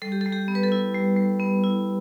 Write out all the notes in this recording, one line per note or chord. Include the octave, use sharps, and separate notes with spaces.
G3 A4
G4
G3 A4
G4
B3
B4
A4
E4
G3
G3
B3
E4